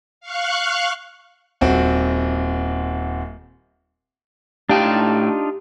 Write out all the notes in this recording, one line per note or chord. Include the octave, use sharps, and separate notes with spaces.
F5 C#6 F#6
D#1 C4 F#4
A2 D4 D#4 F4 G4 F5 G5 A5